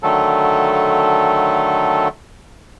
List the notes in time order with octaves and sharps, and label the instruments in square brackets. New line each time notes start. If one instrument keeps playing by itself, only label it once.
[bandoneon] D3 D#3 F#3 A3 A4